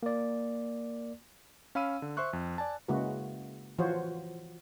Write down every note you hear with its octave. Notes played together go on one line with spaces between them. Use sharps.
A#3 D5
C#4 F5 B5 E6 D#7
D3
C5 E5 C6 C#6 F#6
F2
D5 G#5 A5
C#3 G#3 A#3 E4 F#4 B4
E3 F3 F4 F#4 C5 C#5